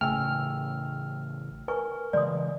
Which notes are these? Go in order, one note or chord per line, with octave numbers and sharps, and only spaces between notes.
A1 C#3 A3 G5 G#5 E6 F6
A#4 B4 G#5 C#6
C#3 E3 G#3 D5 C6 D#6